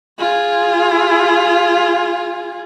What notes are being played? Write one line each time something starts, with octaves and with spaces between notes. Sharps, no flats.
F4 G#4